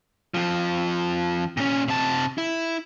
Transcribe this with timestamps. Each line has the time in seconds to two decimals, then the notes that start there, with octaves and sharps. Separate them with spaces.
0.34 F2 F3
1.57 A#2 C#4
1.88 C3 A5
2.38 E4